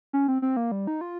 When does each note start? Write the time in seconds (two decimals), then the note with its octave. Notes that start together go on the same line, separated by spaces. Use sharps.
0.13 C#4
0.28 C4
0.42 C4
0.57 A#3
0.72 G3
0.87 D#4
1.01 F4